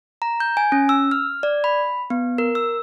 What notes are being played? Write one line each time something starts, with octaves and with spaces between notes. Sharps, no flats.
A#5
G6
G#5
C#4
E6
F6
D5
B5
B3
A#4
E6